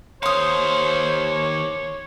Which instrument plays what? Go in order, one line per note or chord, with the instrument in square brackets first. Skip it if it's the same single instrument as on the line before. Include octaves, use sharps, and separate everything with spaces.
[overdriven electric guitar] D#2 F5 [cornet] C5 [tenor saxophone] C#5 [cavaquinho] C6 D#6